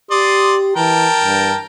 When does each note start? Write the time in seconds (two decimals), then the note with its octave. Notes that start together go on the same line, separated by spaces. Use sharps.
0.11 G4 D5 C6 D#6
0.76 E3 A#4 G5 A5
1.23 G2